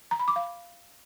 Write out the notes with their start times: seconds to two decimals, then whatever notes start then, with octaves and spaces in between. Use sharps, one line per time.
0.11 A#5
0.19 B5
0.28 D6
0.36 F5